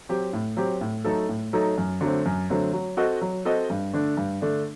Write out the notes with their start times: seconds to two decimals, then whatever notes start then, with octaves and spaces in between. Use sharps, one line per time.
0.09 F#3 C4 G4
0.33 A2
0.57 F#3 C4 G4
0.81 A2
1.04 F#3 A3 D#4 A4
1.29 A2
1.53 F#3 A3 D#4 A4
1.78 F#2
2.01 D3 F#3 A3 C4
2.26 F#2
2.50 D3 F#3 A3 C4
2.73 F#3
2.97 C4 F#4 A4 D#5
3.21 F#3
3.45 C4 F#4 A4 D#5
3.70 G2
3.93 D3 A3 D4
4.17 G2
4.42 D3 A3 D4